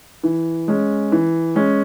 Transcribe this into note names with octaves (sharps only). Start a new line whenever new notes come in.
E3
G#3 C#4
E3
G#3 C#4